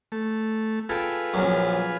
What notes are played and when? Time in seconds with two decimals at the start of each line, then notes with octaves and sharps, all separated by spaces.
0.12 A3
0.89 F4 G#4 A4 B4 G5
1.34 A#1 F#2